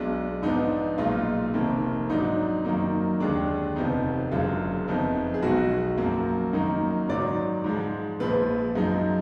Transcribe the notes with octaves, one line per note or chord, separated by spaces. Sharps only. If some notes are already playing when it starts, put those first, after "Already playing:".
Already playing: B1 B2 G#3 D4
G#2 F3 B3 D4 D#4
B1 A#2 G#3 D#4 F4
F1 F2 D#3 A#3
G#2 F#3 D4 D#4
F#2 D#3 A#3 D#4
D#2 D3 G#3 D4
F1 F2 F3 B3 D#4
F#1 F#2 D3 G#3 F4
F#1 F2 F3 B3 D#4
G#4
B1 B2 G#3 D#4 F#4
F#2 F3 A#3
F#2 D#3 A#3 D#4
G#2 D#3 F#3 D5
G#2 F3 G#3
A#1 A#2 F3 G#3 B4
F#2 F3 G#3 D#4